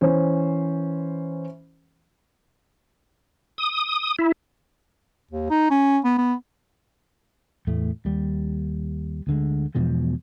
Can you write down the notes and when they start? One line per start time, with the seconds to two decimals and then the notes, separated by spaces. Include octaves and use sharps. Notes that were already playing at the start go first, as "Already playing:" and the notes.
0.01 E3 C#4 C5
3.58 D#6
4.19 E4
5.31 D#2
5.50 D#4
5.70 C#4
6.04 B3
6.18 B3
7.67 E2 A2 A3
8.05 D#2 G3
9.27 D2 D3 G#3
9.75 E2 B2 F3 G#3